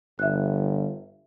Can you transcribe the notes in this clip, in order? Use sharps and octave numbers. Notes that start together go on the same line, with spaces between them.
G1 E5 F#6